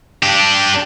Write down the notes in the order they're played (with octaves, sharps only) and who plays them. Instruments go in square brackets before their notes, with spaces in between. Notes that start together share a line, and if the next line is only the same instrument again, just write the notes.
[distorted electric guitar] D4 G4